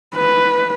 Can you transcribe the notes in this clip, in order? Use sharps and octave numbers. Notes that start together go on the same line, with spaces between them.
B4